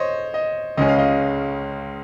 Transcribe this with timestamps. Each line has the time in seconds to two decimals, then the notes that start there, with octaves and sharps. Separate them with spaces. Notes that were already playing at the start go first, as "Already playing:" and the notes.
Already playing: C5 C#5 D#5
0.34 D#5
0.77 C#2 C#3 G#3 C#4 D#5
0.89 F5
0.98 D#5